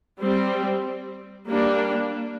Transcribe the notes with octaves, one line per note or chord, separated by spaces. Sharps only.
G3 C4
G3 A#3 D4